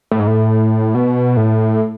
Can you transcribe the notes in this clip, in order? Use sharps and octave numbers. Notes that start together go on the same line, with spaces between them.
A2
G#2
A2
B2
A2